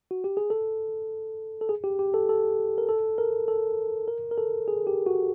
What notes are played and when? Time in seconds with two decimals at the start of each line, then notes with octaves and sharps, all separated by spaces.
0.11 F#4
0.24 G4
0.37 G#4
0.50 A4
1.61 A4
1.69 G#4
1.84 G4
1.99 G4
2.14 A4
2.29 A4
2.78 A#4
2.89 A4
3.18 A#4
3.48 A4
4.08 A#4
4.31 A#4
4.37 A4
4.68 G#4
4.87 G4
5.06 F#4